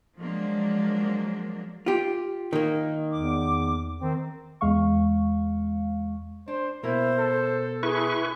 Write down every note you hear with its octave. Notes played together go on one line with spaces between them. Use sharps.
F3 F#3 G#3 A#3 D4
F4 G4
D#3 A#3
E2 D6
D#3 C4
E2 G#3 F5 C#6
D4 C5
B2 A#3 E4 A#4 C5
A4
E4 G#4 B4 C#6